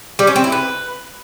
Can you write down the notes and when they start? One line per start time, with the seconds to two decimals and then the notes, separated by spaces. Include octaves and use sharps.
0.19 G3
0.27 C#4
0.36 C4
0.44 E4
0.52 B4